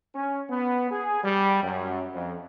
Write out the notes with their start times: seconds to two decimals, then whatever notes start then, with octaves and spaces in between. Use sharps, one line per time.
0.15 C#4
0.50 B3
0.91 G#4
1.24 G3
1.63 F#2
2.14 F2